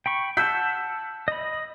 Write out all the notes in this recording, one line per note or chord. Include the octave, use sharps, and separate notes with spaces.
G5 B5 C#6
F#5 A5 E6 G6 B6
D#5 B5